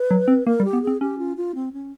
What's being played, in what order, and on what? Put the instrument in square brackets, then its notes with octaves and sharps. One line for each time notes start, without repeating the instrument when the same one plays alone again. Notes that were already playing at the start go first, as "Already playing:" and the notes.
Already playing: [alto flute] B4
[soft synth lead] F#3
C4
[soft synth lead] A#3 [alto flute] A#4
[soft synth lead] G3
[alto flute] G4
[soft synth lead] B3
[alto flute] G#4
[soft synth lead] C4
[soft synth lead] C#4 [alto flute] G4
[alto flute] F4
F4
C4
C#4